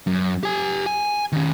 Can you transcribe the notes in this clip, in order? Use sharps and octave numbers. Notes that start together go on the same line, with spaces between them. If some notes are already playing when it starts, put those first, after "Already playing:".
F#2
G4 G#5
G#5
D#3 C#4